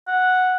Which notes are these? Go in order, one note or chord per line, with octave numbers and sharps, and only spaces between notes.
F#5